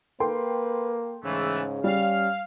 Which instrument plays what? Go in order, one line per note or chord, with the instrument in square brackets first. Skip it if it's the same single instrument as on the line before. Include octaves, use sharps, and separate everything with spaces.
[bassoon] A#3 [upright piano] A4 G5 C6 [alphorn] B4
[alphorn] G#2 [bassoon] C#3 [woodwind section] E3 A3
[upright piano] G3 [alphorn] C#4 [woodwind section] F5